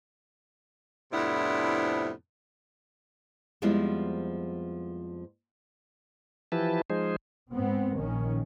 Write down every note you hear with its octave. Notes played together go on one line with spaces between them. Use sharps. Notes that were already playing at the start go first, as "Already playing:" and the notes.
F2 A2 C3 B3 D4 E4
F2 F3 G3 G#3 B3 E4
E3 F3 E4 G4 B4 A5
F3 G#3 D#4 G#4 C5
G#2 B3 C4
A#1 D#3 C#4